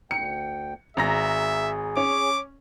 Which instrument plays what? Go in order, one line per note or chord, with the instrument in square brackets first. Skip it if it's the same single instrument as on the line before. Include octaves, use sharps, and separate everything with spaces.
[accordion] D2 G5 [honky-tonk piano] C#7
[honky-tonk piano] G#1 A#5 A#6 [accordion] G#4 [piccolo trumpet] E5
[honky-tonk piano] C#4 [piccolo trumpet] D6